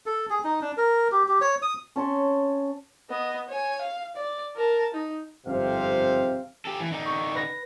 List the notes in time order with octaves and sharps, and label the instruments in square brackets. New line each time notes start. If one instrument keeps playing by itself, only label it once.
[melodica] A4
G#4
D#4
D4
A#4
G4
G4
C#5
D#6
[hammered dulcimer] C#4 A5 C6 C#6
[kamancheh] B3 D#5
C#5 G#5
F5
D5
A#4 A5
D#4
[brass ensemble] G1 F2 G#2 C3 C4 F5
[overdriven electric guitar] G4 A4
E3
D3 D#4
[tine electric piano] C#6
B4 A#6